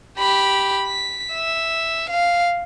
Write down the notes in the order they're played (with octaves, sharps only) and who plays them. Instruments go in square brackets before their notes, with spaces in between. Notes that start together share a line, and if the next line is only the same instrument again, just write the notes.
[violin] G4 B5
B6
E5
F5